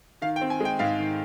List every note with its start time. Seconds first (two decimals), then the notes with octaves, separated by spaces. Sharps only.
0.22 D#3 F5
0.36 G5
0.41 C4
0.50 G#5
0.60 G#3 G5
0.79 G#2 F5
0.99 D#3